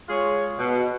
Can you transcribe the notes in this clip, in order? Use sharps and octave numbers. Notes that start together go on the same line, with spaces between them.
G#3 F4 G#4 C#5
B2